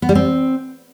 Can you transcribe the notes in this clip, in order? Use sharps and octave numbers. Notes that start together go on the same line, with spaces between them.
B3
G3
C4